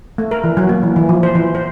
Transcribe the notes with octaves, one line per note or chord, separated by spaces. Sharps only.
A3
A#4
E3
F#3
A#3
E3
E3
F3
C5
E3
C5